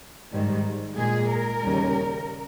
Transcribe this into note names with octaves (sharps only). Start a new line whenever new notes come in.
G#2 D#3 G3
A#2 G#3 G#4
A#4
D#2 C#3 G3